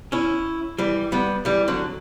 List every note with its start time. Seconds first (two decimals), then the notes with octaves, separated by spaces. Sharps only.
0.12 C#4 E4
0.78 E3 G3
1.12 G3 B3
1.45 E3 G3
1.68 D3 F#3